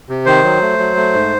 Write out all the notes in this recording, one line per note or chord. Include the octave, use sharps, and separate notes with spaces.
C3
D#3 C5
F#3
A3
F#3
A3
G#2